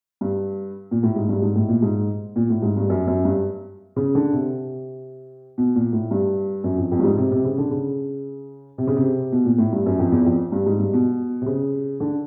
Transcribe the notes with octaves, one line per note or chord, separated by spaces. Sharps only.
G2
A#2
A2
G#2
G2
G#2
A2
A#2
G#2
A#2
A2
G#2
G2
F#2
F#2
G2
C#3
D3
C3
B2
A#2
A2
G2
F#2
F2
F2
G2
G#2
C3
C3
C#3
D3
C#3
C3
C#3
C3
B2
A#2
A2
G2
F#2
F2
E2
F2
G2
G#2
G2
B2
C3
C#3
D3